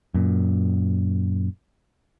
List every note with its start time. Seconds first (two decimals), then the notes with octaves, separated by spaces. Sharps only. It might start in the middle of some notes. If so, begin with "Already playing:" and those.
0.14 F#2 A#2